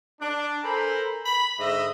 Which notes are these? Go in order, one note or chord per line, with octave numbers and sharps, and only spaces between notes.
D4
A4 A#4 C5 G#5 A#5 B5
B5
G#2 D3 D#5 E5